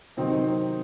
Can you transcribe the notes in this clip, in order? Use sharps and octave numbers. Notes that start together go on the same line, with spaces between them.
C3 D#3 F#3 C4 D#4
C4